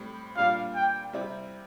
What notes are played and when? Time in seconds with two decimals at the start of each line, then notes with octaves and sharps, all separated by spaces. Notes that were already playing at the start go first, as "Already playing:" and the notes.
Already playing: A2 G3 C4
0.36 A#2 G3 D4 F4 F5
0.75 G5
1.13 C3 G3 C4 E4